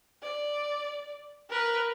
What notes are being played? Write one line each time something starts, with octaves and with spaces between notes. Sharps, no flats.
D5
A#4 B4